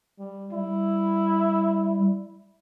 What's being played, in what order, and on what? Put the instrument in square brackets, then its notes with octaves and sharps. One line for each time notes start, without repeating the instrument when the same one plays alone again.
[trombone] G3
[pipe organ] G3 [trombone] E4